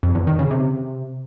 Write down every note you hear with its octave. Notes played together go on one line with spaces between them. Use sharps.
F2
E2
D#3
C#3
C3